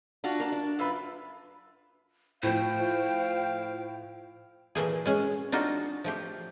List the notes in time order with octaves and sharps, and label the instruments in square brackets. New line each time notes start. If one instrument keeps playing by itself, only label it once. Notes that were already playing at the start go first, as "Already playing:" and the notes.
[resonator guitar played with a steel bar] D4 F4 F#4
A#3 D4
D4
F#2 F4 B4
[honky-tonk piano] A2 F3 [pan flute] C5 [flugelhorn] F5 [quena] G5
[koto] A#2 E3 A3 G#4
G#3 C#4 G#4
D4 D#4 F4 F#4 A4
F3 A3 G4